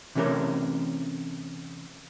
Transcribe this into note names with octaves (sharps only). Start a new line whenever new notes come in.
C3 E3 A3 C#4 G4 A#4